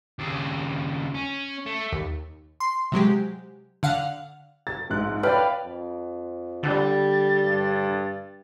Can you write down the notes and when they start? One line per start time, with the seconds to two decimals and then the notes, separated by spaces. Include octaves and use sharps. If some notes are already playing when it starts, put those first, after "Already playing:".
0.19 D#2 C#3
1.15 C#4
1.66 A3
1.92 D#2
2.60 C6
2.92 C3 F#3 G#3 G4
3.83 D3 F5 F#5
4.67 A6
4.90 A#1 G#2 F#6
5.23 B4 C#5 D5 F5 G5 B5
5.64 F2
6.63 D3 G3 A6
7.45 G2